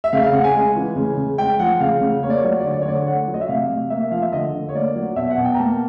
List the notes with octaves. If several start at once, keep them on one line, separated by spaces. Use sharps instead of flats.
E5
C#3 F5
F5
C#3 F#5
G#5
G#3
E3
C#3
C#3
G#3 G5
F3 F#5
C#3 F5
C#3
A#3 C#5
D5
C#5
F#3 D5
C#5
D5
D3 C#5
D5
C#5
D3 D5
C#5
A3 F#5
F#3
D#5
E5
C3 F5
C3
A#3 E5
F3 F5
E5
D3 D#5
D3
C#5
A#3 D5
F#3
B2 E5
F#5
B2
G5
A#5
A#3 A5